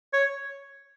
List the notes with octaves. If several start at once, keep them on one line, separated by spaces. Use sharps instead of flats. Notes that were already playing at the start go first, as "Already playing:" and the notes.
C#5